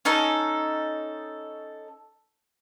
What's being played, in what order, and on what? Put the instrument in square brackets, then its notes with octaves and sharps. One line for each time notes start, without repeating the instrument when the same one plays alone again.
[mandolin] C#4 D#4 A4